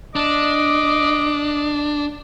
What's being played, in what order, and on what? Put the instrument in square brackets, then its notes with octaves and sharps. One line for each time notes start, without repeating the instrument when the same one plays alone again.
[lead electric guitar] D4 [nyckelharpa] D#5 D6